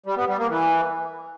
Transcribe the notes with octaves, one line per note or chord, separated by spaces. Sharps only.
G3
B3
G3
A#3
E3